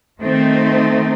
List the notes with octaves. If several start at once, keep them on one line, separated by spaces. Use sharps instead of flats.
D#3 A3 C4 D#4